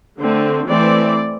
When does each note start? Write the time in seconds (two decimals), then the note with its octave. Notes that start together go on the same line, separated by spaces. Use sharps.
0.21 D3 A3 C4
0.68 E3 A3 C4 D5